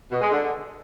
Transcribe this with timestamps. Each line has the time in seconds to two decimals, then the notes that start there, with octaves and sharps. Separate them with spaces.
0.11 B2
0.21 G#3
0.31 D3